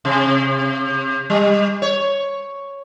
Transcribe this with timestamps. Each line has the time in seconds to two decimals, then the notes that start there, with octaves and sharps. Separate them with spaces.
0.05 C3
1.30 G3
1.82 C#5